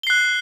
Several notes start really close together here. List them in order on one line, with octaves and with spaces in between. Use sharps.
G7 C7 F#6